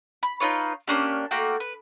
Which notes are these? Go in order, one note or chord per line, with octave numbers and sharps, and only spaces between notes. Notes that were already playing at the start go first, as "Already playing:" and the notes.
B5
D#4 F4 B4 C#5
A#3 C#4 D4 G4
A3 A#3 F#4 G5
B4